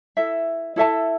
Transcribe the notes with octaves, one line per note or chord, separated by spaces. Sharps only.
E4 A4 E5
E4 A4 E5 A5